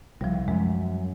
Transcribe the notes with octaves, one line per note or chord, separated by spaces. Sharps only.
C2 F3 G3
F#2 G#3